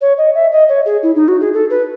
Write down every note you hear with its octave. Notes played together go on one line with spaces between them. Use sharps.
C#5
D#5
E5
D#5
C#5
G#4
E4
D#4
F#4
G#4
A4
B4